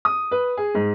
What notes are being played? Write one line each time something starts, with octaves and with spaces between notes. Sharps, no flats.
D#6
B4
G#4
G#2